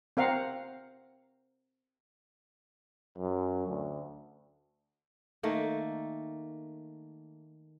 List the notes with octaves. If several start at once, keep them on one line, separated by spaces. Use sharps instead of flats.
C4 A#4 F5 F#5
F#2
D2
D#3 A3 A#3